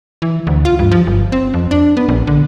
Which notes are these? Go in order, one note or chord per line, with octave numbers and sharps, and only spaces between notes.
E3
D2
F4
G2
F3
G1
C4
F2
D4
B3
A#1
D3